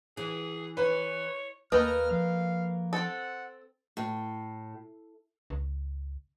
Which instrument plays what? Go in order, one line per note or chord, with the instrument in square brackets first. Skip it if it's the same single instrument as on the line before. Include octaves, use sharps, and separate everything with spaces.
[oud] E3 [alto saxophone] G#4
[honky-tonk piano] B4 [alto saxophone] C#5
[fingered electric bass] D#2 [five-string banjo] A3 D#5 G5 [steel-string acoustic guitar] A#3 B4 [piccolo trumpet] F6
[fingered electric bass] F3 [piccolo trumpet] F5
[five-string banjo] C4 A4 [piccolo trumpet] F#5
[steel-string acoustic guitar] A2
[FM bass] C#2